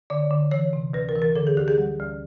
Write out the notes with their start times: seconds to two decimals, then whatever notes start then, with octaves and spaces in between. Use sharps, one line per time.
0.10 D3 D5
0.31 D3
0.51 E3 C#5
0.73 C3
0.93 D2 B4
1.09 A#4
1.15 E3
1.22 A#4
1.36 D3 A4
1.47 G#4
1.57 D2 G4
1.68 G#4
1.78 G3
2.00 D2